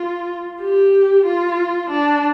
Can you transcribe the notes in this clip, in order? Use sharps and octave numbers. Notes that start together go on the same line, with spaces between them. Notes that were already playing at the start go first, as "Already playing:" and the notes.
Already playing: F4
G4
F4
D4